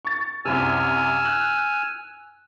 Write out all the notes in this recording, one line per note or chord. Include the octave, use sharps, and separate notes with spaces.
C#6 A6
C2 F#2 C3 G#5 E6 F6
F#6